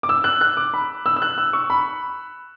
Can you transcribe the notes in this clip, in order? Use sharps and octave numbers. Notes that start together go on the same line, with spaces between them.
D6
E6
F#6
F#6
D6
B5
E6
E6
F#6
E6
C#6
B5